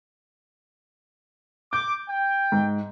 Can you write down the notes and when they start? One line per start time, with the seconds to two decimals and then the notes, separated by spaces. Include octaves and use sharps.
1.73 D6 G6
2.10 G5
2.52 G#2